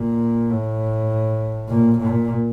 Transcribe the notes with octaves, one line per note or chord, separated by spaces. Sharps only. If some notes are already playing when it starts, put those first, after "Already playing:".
Already playing: A#2
A2
A#2
A#2